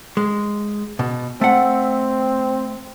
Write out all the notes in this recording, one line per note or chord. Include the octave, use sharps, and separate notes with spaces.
G#3
B2
A3 C4 F#5